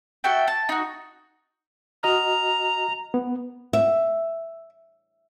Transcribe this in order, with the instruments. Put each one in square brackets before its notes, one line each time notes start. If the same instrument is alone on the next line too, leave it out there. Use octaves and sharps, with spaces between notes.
[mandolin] F#4 A4 E5 G5
A5
D#4 F#4
[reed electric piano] F#4 D#5 F6 [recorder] A#5
[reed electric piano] B3
[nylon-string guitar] E5